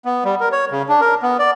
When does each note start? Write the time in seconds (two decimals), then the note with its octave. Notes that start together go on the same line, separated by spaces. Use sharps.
0.05 B3
0.24 G3
0.40 A#4
0.52 C#5
0.72 C#3
0.89 D4
1.01 A#4
1.23 B3
1.39 D5